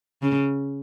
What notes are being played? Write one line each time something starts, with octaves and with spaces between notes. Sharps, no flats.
C#3